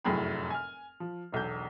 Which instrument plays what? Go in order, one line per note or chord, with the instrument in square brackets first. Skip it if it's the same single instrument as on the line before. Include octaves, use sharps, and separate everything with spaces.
[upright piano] F1 F#2 A2 G#4 G5 B5
G#5 F6
F3
E1 B1 A4 G6